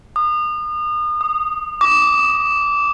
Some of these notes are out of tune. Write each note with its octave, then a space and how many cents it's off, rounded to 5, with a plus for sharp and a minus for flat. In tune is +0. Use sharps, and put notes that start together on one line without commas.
D#6 -35
D#6 -10
D6 -20